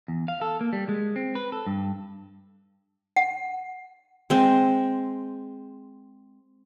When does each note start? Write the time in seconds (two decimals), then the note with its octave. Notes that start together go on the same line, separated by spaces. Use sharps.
0.08 E2
0.28 F5
0.41 A4
0.61 A#3
0.73 G3
0.89 G#3
1.16 C4
1.35 B4
1.52 A4
1.67 G2
3.16 F#5
4.30 G#3 C4